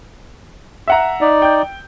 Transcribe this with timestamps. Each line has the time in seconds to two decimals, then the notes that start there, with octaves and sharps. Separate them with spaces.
0.88 E5 F#5 A#5
1.21 D#4 D5
1.42 G5 G6